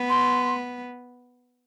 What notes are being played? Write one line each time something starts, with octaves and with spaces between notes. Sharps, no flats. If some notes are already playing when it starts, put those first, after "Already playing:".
Already playing: B3
C6